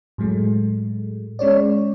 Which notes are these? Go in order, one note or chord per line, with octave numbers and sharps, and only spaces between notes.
A2 F#3 G#3 A3
G#3 C#4 C#5 D5